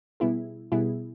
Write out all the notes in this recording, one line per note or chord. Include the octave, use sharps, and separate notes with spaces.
B2 G3 B3 E4 G#4
B2 G3 B3 E4 G#4